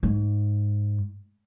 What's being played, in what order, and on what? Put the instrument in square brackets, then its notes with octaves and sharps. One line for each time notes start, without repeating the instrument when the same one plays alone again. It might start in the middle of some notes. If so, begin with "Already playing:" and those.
[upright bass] G#2